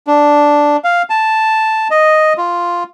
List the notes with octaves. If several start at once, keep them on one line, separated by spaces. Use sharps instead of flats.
D4
F5
A5
D#5
F4